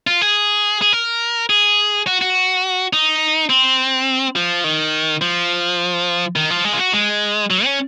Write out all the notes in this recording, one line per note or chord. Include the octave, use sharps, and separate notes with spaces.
F4
G#4
G#4
A#4
G#4
F#4
F#4
D#4
C4
F3
D#3
F3
D#3
F3
G#3
F4
F#4
G#3
F#3
C#4